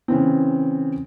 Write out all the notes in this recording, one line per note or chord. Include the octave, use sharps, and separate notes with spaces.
C#3 E3 C4